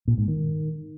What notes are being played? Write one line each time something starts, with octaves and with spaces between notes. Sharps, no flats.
A#2
G#2
D#3